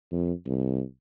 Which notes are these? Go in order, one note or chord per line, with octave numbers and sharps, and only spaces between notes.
F2
C2